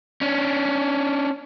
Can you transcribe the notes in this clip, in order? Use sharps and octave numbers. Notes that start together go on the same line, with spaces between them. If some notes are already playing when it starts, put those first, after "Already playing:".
C#4 D4